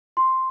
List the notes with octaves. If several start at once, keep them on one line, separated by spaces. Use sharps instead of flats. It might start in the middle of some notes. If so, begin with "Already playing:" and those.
C6